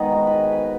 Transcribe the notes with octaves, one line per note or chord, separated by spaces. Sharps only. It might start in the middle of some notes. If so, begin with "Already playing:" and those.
Already playing: G#2 D#3 B3 D#4 G#4 B4
F#4
B4
G#4
B4